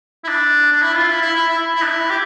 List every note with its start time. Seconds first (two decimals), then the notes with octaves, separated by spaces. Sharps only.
0.24 E4
0.28 D4
0.72 D4
0.82 E4
0.95 F4
1.09 E4
1.22 E4
1.35 E4
1.48 E4
1.75 E4
1.82 D4
1.89 E4
2.10 G4